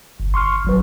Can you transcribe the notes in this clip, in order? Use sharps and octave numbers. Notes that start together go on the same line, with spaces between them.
G1
C6 C#6 F6
G#1 F#3 B4